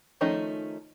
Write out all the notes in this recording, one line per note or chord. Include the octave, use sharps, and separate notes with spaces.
D#3 F3 A3 C#4 D#4